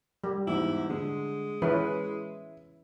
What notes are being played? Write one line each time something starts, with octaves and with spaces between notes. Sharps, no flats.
G3
E2 G#2 E4
D3 G#3
E3 C#4 E4 B4